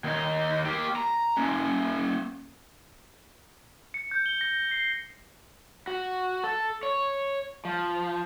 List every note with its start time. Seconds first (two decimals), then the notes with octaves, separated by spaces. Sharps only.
0.04 D#2 D#4
0.66 A#3 G4
0.96 A#5
1.37 A#3 C#4
3.94 C#7
4.11 G6
4.26 G7
4.41 A#6
4.71 C7
5.87 F#4
6.44 A4
6.83 C#5
7.65 F3